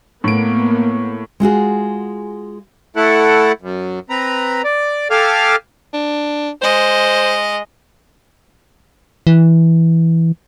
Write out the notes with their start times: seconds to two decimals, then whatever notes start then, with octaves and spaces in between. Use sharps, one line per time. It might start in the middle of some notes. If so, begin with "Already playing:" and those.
0.24 A2 A#3 B3 D7
1.40 G#3 F4 F#4 G#4
2.96 A3 E4 A4 F#5
3.62 F#2
4.10 C4 B4 A#5
4.64 D5
5.11 G4 A4 F5 G#5 D6 F6
5.94 D4
6.62 G#3 C5 D#5
9.27 E3